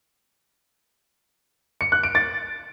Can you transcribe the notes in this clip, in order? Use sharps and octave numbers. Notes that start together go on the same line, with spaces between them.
C#7
F#6
D7
A6